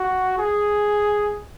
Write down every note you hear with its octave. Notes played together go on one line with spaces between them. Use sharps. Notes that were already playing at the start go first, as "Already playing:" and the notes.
Already playing: F#4
G#4